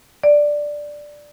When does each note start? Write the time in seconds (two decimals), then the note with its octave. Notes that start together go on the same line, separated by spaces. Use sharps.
0.23 D5